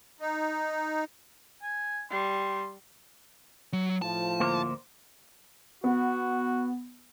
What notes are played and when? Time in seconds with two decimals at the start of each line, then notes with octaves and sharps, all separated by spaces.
0.20 D#4
1.62 G#5
2.11 G3 C6
3.73 F#3
4.02 A2 F3 A5
4.40 D2 A#3 C5
5.84 B3 F#4